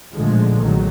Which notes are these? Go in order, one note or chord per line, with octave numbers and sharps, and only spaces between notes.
A1 A#2 D3 F3 G#3 A3
B1 D#3 F#3